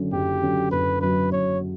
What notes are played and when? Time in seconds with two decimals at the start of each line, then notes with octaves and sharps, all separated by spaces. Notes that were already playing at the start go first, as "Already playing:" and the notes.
Already playing: F#1 F#2 D3 F#3 C#4
0.12 F#1 G4
0.42 F#2 D3 F#3 C#4
0.72 F#1 B4
1.02 F#2 D3 F#3 C#4 B4
1.32 F#1 C#5